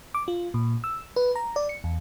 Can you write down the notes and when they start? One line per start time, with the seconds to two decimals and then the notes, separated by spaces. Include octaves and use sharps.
0.14 D6
0.28 F4
0.54 A#2
0.84 E6
1.16 B4
1.36 A#5
1.56 D5
1.69 C#7
1.84 E2